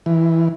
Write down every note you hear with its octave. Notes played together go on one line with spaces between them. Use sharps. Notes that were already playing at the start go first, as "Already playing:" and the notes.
E3